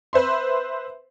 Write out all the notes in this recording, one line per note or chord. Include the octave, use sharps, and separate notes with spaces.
B4 C5 E5 C6